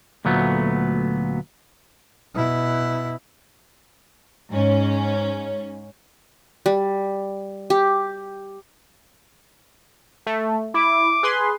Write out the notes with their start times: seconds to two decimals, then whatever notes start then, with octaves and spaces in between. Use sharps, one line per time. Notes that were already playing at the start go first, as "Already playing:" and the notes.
0.25 D2 A#2 F#3 A3 B3
2.35 B2 E4
4.52 G#2 C#4
6.66 G3
7.70 G4
10.26 A3
10.74 E4 D6
11.23 G#4 B4 C6